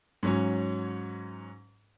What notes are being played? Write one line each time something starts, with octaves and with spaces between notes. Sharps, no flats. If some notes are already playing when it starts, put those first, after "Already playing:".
G#2 F#3 C#4